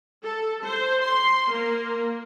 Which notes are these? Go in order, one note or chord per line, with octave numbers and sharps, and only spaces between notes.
A4
C5
C6
A#3